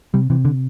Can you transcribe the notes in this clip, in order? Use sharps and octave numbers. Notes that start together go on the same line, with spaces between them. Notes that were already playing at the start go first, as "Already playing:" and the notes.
C3 G3
C3 E3
D3